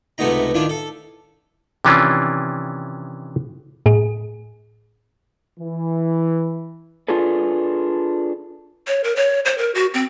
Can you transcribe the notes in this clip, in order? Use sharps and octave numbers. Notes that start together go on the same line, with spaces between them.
C#2 C3 A3 B3 D#4 A#5
D#3 D4 E4 F4
A4
C3 D#3 E3 C#4 D4 F4
A2 G#4
E3
D4 F4 G#4 A4 B4
C#5
A#4
C#5
C5
A#4
F#4
C4